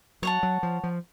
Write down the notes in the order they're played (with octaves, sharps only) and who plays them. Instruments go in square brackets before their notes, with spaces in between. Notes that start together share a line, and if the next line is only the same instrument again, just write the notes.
[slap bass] F#3 [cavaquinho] C#5 F#5 A5
[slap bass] F#3
F3
F3